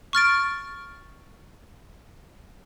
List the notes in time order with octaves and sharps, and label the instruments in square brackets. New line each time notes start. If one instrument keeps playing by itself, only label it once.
[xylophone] C#6 F6 A6 D7